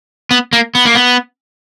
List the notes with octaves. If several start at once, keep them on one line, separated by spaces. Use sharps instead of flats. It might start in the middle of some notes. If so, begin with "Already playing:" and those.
B3
A#3
B3
A#3
B3